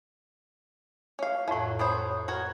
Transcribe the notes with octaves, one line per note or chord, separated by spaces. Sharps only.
C#4 F5
F2 A2 E3 F#3
F#3 C#4 C5 B5 D#6
F#4 A#4 C#5